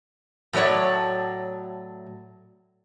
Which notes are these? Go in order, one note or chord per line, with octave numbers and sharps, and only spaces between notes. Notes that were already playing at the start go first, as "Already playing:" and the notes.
A2 F#3 A3 C#5 D5